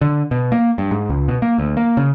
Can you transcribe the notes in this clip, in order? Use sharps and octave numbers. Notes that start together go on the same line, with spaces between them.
D3
B2
A#3
G2
G#2
C#2
B2
A#3
D2
A#3
C#3